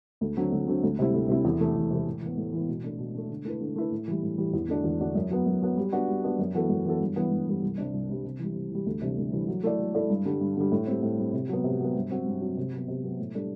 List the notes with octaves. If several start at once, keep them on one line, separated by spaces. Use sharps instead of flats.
D2
D3 F#3 C4
D2
D3 F#3 C4
D2
C3 G3 C4 E4
D2
C3 G3 C4 E4
E2
C3 E3 A3
E2
C3 E3 A3
A2
E3 B3
A2
E3 B3
B2
A3 D4
B2
A3 D4
D3
A3 E4 B4
D3
A3 E4 B4
A2
E3 G3
A2
E3 G3
E2
D3 A3 D4 F#4
E2
D3 A3 D4 F#4
F#2
F#3 B3
F#2
F#3 B3
G3
B3 D4 F#4
G3
B3 D4 F#4
F#2
E3 B3 F#4 A4
F#2
E3 B3 F#4 A4
G2
E3 G3 B3
G2
E3 G3 B3
C2
C3 G3 D4
C2
C3 G3 D4
C3
E3 G3
C3
E3 G3
D2
C3 E3 G3 D4
D2
C3 E3 G3 D4
F#3
A3 E4 A4 D5
F#3
A3 E4 A4 D5
G2
D3 G3
G2
D3 G3
A2
G3 C4
A2
G3 C4
C3
F#3 B3
C3
F#3 B3
G2
F#3 C4 F#4
G2
F#3 C4 F#4
C3
F#3
B3
C3
F#3 B3
A2
G3 D4 A4